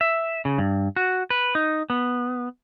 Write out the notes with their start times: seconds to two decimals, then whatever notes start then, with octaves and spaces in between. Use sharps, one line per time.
0.01 E5
0.45 C#3
0.58 G2
0.96 F#4
1.30 B4
1.55 D#4
1.90 B3